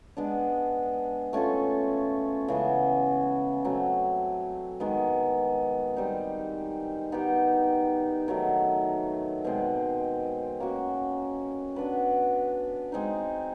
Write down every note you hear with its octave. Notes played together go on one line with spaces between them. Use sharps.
G#3 B3 D4
A3 C#4 F4 A4
C#3 E3 G#3 B3
F#3 A3 C4
D#3 G#3 B3
G3 C4 D#4
B3 D#4 G4
D#3 F#3 A3
B2 G#3 C4
A#3 C#4 F#4
B3 D4 F#4 B4
G#3 C4 D#4